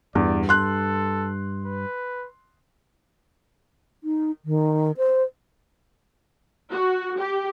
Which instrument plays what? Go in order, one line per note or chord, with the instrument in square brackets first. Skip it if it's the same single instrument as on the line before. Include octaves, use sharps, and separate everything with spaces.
[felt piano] E2 [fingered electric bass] G2 [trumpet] D5
[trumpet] A4 [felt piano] C6 F#6
[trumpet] B4
[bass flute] D#4
D#3
C5
[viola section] F#4
G4